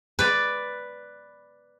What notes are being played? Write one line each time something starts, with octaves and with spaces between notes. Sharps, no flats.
B4 D5